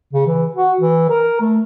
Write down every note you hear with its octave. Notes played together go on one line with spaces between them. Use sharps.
C#3
E3
F#4
E3
A#4
A3